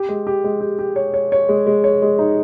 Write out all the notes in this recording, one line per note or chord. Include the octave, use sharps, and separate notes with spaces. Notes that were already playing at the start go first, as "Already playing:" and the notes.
Already playing: G4
G#3
G4
G#3
G4
G4
C#5
C#5
C#5
G#3
G#3
C#5
G#3
D#4